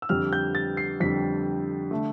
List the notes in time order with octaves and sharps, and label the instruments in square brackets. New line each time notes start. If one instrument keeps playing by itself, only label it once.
[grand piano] E6
F2 D3 G3 F6
G6
A6
C7
F2 D3 G3 B6
D3 A3